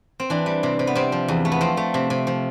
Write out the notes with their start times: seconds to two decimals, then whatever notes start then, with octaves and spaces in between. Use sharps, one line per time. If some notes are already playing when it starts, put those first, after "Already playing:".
0.20 C4
0.30 E3 D4
0.46 G3
0.63 C3
0.79 C3
0.87 B3
0.95 C3 C4
1.12 F3
1.28 E2
1.45 A3
1.52 B3
1.61 F3 C4
1.77 A3
1.94 C3
2.10 C3
2.27 F3